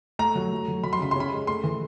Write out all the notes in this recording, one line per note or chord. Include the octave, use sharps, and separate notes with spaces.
A3 A#5
F#3
A3
F#3
F#3 B5
C6
C#3 B5
C6
C#4 B5
G#3
A3 C6
E3